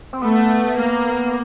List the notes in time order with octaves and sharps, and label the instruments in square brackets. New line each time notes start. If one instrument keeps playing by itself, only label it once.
[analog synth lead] C4
[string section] A3 [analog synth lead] B3
[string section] A#3